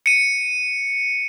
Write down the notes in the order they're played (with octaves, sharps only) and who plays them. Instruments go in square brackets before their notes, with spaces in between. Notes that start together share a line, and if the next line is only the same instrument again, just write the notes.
[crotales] C#7 D#7